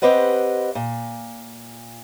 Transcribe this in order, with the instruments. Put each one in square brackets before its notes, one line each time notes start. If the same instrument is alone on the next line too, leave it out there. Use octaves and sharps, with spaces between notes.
[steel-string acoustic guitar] C4 G4 B4 D#5 F#5
A#2